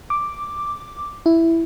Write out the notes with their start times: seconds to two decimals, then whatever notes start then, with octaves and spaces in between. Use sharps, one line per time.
0.10 D6
1.26 E4